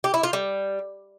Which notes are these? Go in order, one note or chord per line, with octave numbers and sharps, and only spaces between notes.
G4
E4
F4
G3